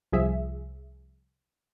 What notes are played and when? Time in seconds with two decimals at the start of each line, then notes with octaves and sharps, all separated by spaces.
0.12 C2 F3 G#4 E5